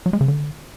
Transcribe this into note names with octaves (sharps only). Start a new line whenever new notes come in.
F#3
G#3
C#3
D3